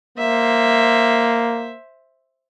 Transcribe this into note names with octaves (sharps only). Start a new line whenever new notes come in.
A#3 C5 E5